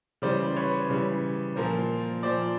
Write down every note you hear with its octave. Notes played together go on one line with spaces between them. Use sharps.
C#3 E3 G3 C5 D5
B4 C#5
C#3 E3 G3
A#2 F3 A#4 C5
A#2 F3 C5 D5